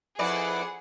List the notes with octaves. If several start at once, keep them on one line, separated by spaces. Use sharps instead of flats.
F2 E4 G#4 B4 C5 D5 F#5 D6